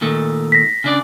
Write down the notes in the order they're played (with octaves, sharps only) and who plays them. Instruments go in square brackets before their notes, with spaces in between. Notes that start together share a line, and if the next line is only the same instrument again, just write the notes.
[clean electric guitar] A#2 D#3 A3
[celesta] A#6 B6
[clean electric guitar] C#3 D4 D5